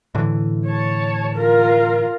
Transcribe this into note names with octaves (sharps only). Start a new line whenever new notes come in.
A2 D3 E3
C#5 A5
F4 A#4